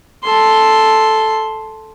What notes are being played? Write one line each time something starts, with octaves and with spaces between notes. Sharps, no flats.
A4 C6